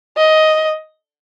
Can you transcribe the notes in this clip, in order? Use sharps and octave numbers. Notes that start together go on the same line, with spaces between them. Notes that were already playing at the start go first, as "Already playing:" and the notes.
D#5